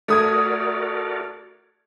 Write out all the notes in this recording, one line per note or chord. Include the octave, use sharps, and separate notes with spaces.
A3 F#4 A#4 D5 D#6 G#6